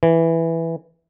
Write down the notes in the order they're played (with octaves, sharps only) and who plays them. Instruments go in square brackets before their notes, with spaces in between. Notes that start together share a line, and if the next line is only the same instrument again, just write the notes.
[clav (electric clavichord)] E3